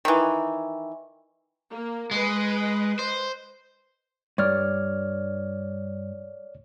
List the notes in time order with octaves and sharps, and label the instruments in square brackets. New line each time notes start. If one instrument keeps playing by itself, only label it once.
[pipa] D#3 E3
[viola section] A#3
[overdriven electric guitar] G#3 [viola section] B4 D#5
[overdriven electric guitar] C5
[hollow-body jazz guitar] G2 [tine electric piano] C#5 D5 F6